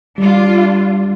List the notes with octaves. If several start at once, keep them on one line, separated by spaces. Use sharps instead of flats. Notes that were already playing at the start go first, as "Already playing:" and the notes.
G3 D4 F4